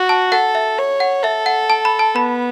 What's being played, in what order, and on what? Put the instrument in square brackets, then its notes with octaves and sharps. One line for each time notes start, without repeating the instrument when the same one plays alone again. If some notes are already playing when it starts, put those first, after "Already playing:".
Already playing: [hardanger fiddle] F#4
[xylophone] A5
[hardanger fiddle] A4 [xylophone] F#5
[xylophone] E5
[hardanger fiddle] C#5
[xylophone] F#5
[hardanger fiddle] A4 [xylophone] E5
[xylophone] F#5
A5
B5
A5
[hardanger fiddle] B3 [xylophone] B5